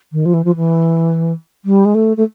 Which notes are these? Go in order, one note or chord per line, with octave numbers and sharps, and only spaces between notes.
D#3
F3
E3
F3
E3
G3
G#3
A3
A3